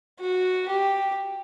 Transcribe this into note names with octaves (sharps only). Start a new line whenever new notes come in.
F#4
G4